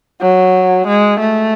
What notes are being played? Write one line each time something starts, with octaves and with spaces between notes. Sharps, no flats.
F#3
G#3
A3